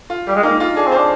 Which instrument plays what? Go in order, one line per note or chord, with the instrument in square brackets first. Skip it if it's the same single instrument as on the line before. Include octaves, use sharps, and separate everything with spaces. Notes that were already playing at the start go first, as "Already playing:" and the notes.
[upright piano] F4
[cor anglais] G3 [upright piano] G4
[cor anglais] G#3
[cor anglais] A#3 [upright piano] D#4
[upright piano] F4
[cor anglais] D4 [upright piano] G#4
[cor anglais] C4
[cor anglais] D4 [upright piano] C5